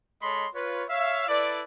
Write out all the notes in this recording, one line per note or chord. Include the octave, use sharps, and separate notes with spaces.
G#3 A4 C#5 D#5 B5 C6
F4 B4 C#5
C#5 E5 F5
E4 A4 B4 D5